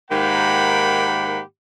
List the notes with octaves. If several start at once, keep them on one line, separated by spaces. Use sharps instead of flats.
G#2 D#3 A#3 G4 F#5 B5